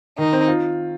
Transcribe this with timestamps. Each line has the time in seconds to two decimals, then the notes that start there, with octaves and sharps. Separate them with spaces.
0.18 D#3 D#4
0.33 C4
0.48 F4